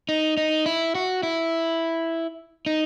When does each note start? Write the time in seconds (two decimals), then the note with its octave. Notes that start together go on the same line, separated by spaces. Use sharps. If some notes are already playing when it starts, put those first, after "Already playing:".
0.09 D#4
0.37 D#4
0.66 E4
0.95 F#4
1.23 E4
2.66 D#4